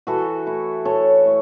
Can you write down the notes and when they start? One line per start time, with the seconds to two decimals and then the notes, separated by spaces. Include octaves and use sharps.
0.07 E3 F#4 A4
0.46 A3 E4
0.85 E3 A4 C#5
1.25 A3 E4